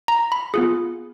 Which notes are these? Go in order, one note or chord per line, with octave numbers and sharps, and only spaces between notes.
A#5
B5
B3 F4 G#4